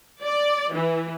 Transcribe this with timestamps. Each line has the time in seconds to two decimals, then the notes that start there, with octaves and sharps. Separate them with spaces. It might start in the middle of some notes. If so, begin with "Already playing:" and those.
0.23 D5
0.73 E3